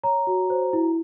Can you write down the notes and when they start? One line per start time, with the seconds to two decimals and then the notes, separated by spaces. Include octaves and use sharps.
0.03 C#5 A#5
0.27 F#4
0.50 C5
0.73 E4